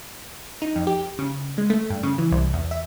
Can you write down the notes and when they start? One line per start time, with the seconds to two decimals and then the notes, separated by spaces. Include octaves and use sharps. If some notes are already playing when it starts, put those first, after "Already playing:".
0.62 D#4
0.76 F2
0.87 G4
1.19 C#3
1.58 G#3
1.70 A3
1.90 G2
2.03 C#3
2.18 E3
2.32 C2
2.53 E2
2.71 E5